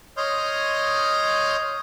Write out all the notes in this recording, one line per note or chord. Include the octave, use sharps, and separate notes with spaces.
C#5 D#5 C6 D#6 F6 G6